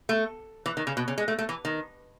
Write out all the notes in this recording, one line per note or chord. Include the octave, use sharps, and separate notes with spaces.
A3
E3
D#3
C#3
B2
C#3
G#3
A3
A3
E3
D#3